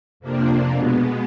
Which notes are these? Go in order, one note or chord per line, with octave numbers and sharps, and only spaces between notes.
F2 C3 F3 A#3 D4
B2 G#3 B3